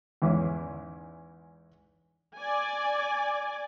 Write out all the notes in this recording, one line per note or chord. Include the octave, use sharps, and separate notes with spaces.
E2 G#2 E3 C#4 D6
D5 G#5